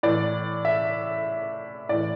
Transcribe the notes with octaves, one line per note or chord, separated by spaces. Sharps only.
A2 E3 D5
E5
A2 E3 D5